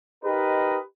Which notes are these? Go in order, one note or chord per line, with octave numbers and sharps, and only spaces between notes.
D#4 G4 A#4 B4 D#5